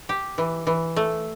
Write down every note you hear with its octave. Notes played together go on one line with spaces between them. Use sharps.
G4
E3
E3
A3